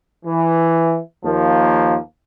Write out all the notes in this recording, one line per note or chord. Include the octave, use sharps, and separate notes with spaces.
E3
D#2 F3 A#3